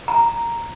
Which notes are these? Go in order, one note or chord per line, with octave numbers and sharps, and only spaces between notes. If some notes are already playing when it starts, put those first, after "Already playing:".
A#5